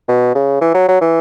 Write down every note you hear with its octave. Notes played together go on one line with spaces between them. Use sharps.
B2
C#3
E3
F#3
F#3
E3